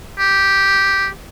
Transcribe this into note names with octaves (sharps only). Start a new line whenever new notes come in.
G4